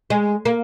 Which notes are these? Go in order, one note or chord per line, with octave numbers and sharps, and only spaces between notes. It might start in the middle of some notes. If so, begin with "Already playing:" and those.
G#3
A#3